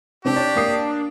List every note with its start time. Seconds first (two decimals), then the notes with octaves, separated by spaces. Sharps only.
0.25 C3 C4 D4 G4
0.36 D4 C#5
0.56 A#3 D#6 C7